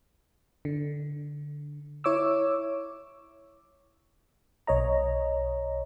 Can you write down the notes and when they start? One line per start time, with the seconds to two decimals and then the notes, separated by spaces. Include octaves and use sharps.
0.65 D3
2.04 E4 C#5 D6 E6
4.67 B1 C#5 D#5 A#5